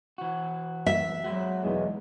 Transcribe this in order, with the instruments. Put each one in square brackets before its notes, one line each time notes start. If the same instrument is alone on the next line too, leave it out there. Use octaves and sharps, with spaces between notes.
[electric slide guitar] E3 F#4
[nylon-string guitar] E5
[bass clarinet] F#3 [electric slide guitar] G#3 F#4
[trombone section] E2 G#3 [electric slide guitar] G#2 B2 D#3